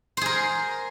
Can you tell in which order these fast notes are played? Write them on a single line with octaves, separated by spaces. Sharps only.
C5 G#4 A#4